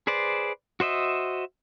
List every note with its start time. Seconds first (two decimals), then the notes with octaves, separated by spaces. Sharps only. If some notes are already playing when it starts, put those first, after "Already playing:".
0.07 G#4 B4 C5 D5
0.80 F#4 C5 D#5 E5